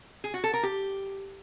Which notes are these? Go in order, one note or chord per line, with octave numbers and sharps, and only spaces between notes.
G#4
F#4
A4
A#4
G4